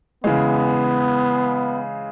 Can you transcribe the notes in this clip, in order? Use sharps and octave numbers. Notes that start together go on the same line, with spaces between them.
C#3 E3 G#3 B3